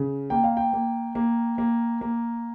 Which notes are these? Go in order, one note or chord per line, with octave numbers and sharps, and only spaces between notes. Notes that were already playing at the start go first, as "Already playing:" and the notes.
Already playing: C#3
A#3 G5
F5
G5
A#3
A#3
A#3
A#3